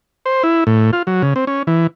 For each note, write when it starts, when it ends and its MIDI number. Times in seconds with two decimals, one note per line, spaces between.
0.26 0.43 72
0.43 0.64 64
0.67 0.91 45
0.93 1.03 65
1.07 1.22 54
1.23 1.34 49
1.36 1.45 60
1.47 1.63 61
1.67 1.87 52